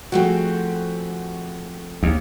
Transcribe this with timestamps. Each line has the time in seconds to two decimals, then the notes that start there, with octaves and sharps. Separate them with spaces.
0.12 F3 A3 C4 F#4 G#4 G5
2.03 D#2